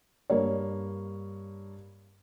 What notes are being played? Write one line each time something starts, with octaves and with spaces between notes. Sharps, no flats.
G2 A#3 C#5